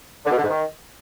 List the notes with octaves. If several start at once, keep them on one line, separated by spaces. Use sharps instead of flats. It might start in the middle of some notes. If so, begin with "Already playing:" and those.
D3
B2
D3
G#2
D#3